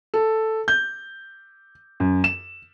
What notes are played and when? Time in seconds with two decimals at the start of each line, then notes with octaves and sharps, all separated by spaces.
0.14 A4
0.68 G6
2.00 F#2
2.24 E7